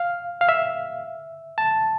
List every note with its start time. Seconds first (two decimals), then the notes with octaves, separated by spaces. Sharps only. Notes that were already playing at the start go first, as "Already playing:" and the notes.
Already playing: F5
0.41 F5
0.49 E5
1.58 A5